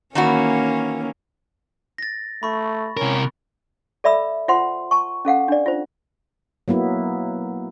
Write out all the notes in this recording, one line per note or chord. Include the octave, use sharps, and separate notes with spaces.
D#3 E3 A#3 C#4 F#4
A6 A#6
A3 B5 C#6
C3 C#4 A#4
A4 D5 E5 B5 E6
F4 C5 F#5 C6
A5 C#6
C#4 A4 F5 F#5
D4 D5
F4 C5
F#3 A#3 B3 E4